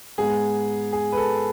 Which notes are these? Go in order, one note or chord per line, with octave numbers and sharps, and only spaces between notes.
G#2 G#3 B3 G#4
G#4
B4
A4